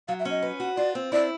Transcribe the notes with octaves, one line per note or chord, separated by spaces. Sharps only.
F#3 F5
E5
C#4
D#5
B4
F#4
F4 D5
C4
E4 D5